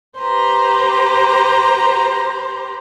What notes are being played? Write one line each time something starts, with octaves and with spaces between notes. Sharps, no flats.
G4 B4 C5 A#5 C6